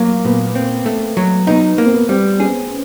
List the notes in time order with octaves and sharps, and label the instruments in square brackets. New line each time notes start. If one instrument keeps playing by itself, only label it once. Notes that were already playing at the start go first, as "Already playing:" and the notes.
Already playing: [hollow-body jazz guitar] F#3 [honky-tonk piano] A#3
[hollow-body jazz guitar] A#2 [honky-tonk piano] B3
[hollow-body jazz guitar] C4
A3
F#3
[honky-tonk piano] B3 [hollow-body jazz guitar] D#4
[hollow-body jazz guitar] A#3 [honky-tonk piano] B3
[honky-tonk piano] C4
B3
[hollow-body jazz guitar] G3 [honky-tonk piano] C4
[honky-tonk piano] C#4 [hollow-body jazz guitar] G#4